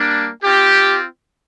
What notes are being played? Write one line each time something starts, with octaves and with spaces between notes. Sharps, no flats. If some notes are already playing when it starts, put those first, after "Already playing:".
Already playing: G3 A#3 D4
C4 F4 G4